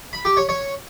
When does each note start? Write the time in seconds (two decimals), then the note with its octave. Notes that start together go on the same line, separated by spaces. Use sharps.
0.13 B5
0.25 G4
0.37 C#5
0.49 C#5